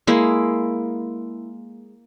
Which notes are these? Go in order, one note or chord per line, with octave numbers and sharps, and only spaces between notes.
G#3 A#3 E4